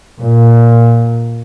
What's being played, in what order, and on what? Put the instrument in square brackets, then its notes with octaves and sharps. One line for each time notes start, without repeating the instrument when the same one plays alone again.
[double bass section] A#2